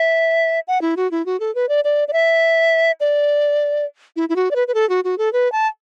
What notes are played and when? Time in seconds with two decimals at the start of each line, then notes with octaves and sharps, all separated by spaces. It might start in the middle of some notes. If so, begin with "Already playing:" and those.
Already playing: E5
0.68 F#5
0.81 E4
0.97 F#4
1.11 E4
1.26 F#4
1.40 A4
1.55 B4
1.69 D5
1.84 D5
2.08 D5
2.13 E5
3.00 D5
4.16 E4
4.29 E4
4.36 F#4
4.51 D5
4.56 B4
4.68 B4
4.74 A4
4.89 F#4
5.04 F#4
5.18 A4
5.33 B4
5.52 A5